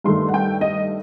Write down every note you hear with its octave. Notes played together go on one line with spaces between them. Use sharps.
G2 D#3 A3 C6
F#5
G5
D#5